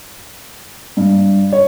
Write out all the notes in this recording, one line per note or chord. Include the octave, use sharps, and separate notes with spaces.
G2
C#5